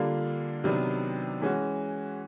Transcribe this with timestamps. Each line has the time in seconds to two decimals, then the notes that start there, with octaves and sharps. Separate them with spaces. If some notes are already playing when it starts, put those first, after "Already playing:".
Already playing: D3 G3 A#3 D4 F4
0.64 C3 D#3 F#3 B3 D4
1.42 E3 G#3 C#4 F#4